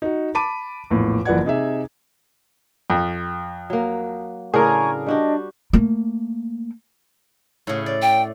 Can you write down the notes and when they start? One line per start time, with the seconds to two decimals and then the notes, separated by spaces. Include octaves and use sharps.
0.02 D#4 F#4
0.35 A5 B5 D6 D#7
0.90 A#1 E2 A2
1.25 F#1 E3 F3 D5 F#5 G#6
1.45 C3 D#4 G#4 E5
2.90 F2
3.70 F#3 A#3
4.54 A2 C#3 D4 G#4 A#4 G#5 A#5 C#6
5.07 G3 D4 F#4 G4 D#5
5.73 A3 A#3
7.67 A2 C#3
7.86 D5
8.02 G5